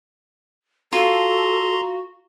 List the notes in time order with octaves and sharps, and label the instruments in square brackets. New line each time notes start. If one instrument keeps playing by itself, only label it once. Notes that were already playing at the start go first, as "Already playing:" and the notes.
[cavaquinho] F4 [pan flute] F#4 [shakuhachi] A4 [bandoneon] A#5 C6